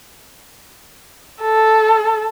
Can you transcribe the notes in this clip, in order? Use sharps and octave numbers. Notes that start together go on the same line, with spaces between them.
A4